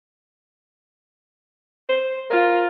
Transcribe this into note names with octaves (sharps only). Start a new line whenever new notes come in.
C5
F4 A#4